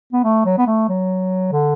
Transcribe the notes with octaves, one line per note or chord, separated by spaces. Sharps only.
B3
A3
F#3
B3
A3
F#3
D3